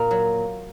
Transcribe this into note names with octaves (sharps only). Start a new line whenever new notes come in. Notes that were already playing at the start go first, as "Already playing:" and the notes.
Already playing: A#2 A#3
F#3